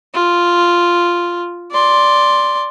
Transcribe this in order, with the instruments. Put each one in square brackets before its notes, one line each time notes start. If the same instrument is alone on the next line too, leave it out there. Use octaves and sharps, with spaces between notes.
[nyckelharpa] F4
D5 C6